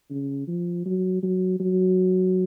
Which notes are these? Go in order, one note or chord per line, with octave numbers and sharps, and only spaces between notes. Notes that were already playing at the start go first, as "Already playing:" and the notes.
C#3
F3
F#3
F#3
F#3